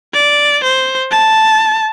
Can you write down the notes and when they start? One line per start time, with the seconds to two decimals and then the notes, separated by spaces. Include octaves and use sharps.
0.14 D5
0.64 C5
1.11 A5